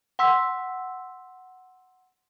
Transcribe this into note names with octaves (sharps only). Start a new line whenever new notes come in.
F#5 C6 E6 B6